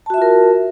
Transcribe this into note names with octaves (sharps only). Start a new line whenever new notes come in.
F4 F#4 A#4 E5 A5